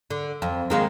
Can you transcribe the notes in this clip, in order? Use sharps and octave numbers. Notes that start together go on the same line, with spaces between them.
D3
F2
D#3 G#3 A#3